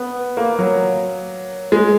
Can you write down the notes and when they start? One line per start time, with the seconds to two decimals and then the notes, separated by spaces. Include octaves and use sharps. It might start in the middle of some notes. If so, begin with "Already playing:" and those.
Already playing: B3
0.37 A#3
0.59 F#3
1.72 G#3